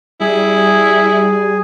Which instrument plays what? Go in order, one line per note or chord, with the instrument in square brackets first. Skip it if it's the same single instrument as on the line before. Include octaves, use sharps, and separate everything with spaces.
[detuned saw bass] G3 [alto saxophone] E4 [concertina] G#4